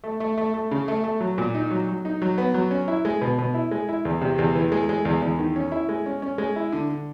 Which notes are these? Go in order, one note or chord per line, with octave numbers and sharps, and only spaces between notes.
A3
A3
A3
A3
C#3
A3
A3
F#3
A#2
D#4
F#3
F#3
D#4
F#3
B3
F#3
C#4
E4
G#3
B2
B2
E4
G#3
E4
E2
C3
E2
E3
G#3
G#3
E2
E2
D#3
C#4
E4
G#3
C#4
C#4
G#3
E4
D3
D3